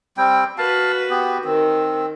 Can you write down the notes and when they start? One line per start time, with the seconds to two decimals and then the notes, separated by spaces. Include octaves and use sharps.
0.17 G3 C4 G5
0.58 F#4 B4 F5 A5
1.10 B3 G4
1.45 D#3 C4